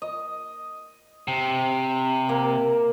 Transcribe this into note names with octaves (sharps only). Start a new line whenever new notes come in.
D#5
C3
A#3